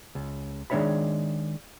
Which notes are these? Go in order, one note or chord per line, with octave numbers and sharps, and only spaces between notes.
C#2
D#3 G#3 D4 C#5 E5 B5